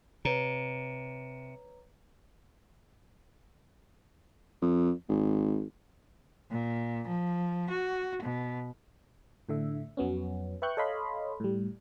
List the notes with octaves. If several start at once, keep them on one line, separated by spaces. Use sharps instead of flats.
C3 B4 C#5 A#5
F2
G#1
A#2
F3
F#4
B2
A2 D3 E5
F2 F#3 B3 C#4
B4 E5 G5 C#6 F#6 G6
A4 C#5 D#5 F5 B5 C6
A2 G3